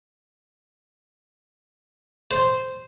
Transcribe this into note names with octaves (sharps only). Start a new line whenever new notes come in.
C5